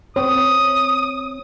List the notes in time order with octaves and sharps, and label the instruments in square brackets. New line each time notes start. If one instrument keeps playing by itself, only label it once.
[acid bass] C4 [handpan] C#5 [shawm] D#6